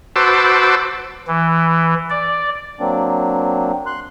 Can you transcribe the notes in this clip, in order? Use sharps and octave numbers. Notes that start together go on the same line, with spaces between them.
F#4 B4 C5 A5 D6 E6
E3
D5
F#3 A#3 C4 D4
C6 F#6